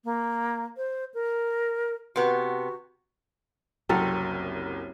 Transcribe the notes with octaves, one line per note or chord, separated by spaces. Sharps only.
A#3
C5
A#4
C3 B3 F#4
F#1 C2 F#3 C4 A4 F6